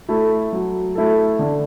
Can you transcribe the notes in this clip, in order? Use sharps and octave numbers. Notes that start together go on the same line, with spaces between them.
A3 E4 A4
F#3
A3 E4 A4
D3